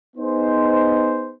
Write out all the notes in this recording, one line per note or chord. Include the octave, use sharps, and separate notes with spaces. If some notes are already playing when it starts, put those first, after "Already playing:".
B3 D#4 G#4 C5